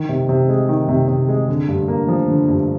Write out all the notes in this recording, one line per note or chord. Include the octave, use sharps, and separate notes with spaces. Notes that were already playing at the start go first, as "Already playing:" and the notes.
Already playing: D#3
C3
C3
G#3
D#3
C3
C3
G#3
D3
G2
A#3
F3
D3
G2